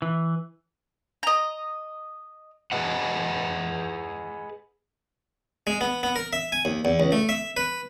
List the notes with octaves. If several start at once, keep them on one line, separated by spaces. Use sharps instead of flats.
E3
D#5 A#5
G#4 B4 D#5 F#5
G#3
B3
B3
A#4
E5
G#5
D#2
E2
C#2
A3
E5
B4